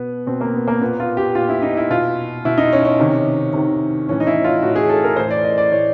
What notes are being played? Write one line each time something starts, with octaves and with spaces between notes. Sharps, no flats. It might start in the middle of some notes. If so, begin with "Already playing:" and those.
Already playing: B2 B3
B2 C4
A#3
B3
A#3
A#2 B3
F4
G4
A#2 F4
E4
D#4
E4
B2 F4
B2 E4
D#4
C#4
C#4
C3 D#3
C3 D#3
A2 E3 C#4
D#4
E4
F4
A2 E3 F#4
G#4
A4
A#4
A2 E3 C5
D5
D#5
D5
A2 E3 C#5